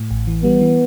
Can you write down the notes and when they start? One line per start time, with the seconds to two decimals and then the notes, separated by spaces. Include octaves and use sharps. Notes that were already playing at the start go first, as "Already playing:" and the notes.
Already playing: A2
0.11 A1
0.27 E3
0.43 G3 B3
0.61 E3